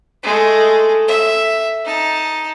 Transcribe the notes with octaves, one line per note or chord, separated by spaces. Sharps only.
G#3 A3
E5
D#4 A5